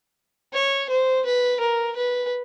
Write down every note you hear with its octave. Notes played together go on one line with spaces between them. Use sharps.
C#5
C5
B4
A#4
B4